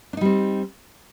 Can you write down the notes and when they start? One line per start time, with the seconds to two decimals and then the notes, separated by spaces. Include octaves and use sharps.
0.13 D4
0.17 D#4
0.21 G3
0.25 C4